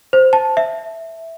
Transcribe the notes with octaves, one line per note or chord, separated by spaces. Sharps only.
C5
A5
E5